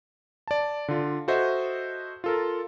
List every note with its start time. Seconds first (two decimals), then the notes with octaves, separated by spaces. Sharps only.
0.47 D5 A5
0.88 D3 F4
1.28 F#4 A4 C5 D#5 E5 F#5
2.24 F4 A4 A#4